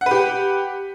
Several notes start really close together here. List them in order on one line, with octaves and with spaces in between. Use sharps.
F#5 B4 G4